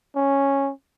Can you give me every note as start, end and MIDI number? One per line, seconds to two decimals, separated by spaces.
0.16 0.71 61